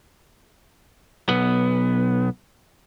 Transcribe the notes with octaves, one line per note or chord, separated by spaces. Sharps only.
B1 B3